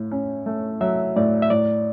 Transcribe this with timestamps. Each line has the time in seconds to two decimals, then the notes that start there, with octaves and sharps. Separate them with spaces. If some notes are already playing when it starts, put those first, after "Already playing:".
Already playing: A2
0.11 C#4
0.46 A3
0.81 F#3 E5
1.16 A2 D5
1.42 E5
1.50 A2 D5